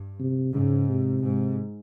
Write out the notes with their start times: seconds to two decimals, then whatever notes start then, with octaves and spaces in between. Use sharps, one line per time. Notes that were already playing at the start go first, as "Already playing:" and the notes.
Already playing: G2
0.20 C3
0.55 G#2 C#3
0.89 C3
1.24 G#2